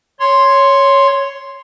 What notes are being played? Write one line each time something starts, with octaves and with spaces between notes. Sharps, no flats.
C#5 C6